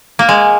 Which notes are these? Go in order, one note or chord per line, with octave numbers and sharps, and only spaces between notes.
A#3
G#3